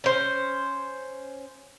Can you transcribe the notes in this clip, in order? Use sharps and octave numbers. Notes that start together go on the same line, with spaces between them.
C#4 C5